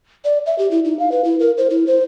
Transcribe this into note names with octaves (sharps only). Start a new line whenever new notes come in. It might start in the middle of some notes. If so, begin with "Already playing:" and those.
D5
E5
G4
E4
D#4
F5
B4
E4
A#4
C5
E4
C5